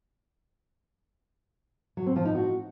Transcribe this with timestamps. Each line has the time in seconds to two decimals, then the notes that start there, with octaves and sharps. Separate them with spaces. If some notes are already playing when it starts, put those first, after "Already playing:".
1.97 F#3
2.06 C4
2.16 F3
2.25 D#4
2.35 F#4